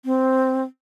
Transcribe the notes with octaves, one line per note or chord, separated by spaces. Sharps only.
C4